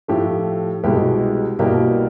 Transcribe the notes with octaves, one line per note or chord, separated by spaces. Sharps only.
A2 F3 A3 G4
C2 B2 G#3 G4
C2 B2 G3 A#3 G4